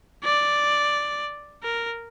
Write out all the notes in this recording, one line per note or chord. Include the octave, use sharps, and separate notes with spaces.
D5
A#4